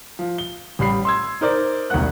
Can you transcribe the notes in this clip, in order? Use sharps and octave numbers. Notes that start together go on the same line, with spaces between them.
F3
G7
A1 G3 B5 C7
C6 E6 G#6
D#4 A#4 C5 D5
E1 C2 D#3 A#3 F#5 F#6